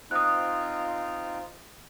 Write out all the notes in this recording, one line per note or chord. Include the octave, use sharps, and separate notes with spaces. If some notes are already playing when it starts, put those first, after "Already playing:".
C4 D#4 F4 D#6 F#6